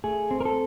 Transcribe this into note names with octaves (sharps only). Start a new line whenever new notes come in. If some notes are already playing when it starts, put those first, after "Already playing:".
A3 G#4
C4
A#4
A4